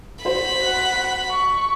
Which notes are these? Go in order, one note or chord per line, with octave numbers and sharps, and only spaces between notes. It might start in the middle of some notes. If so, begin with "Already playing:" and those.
F#4 C5 B5
F#5
C#6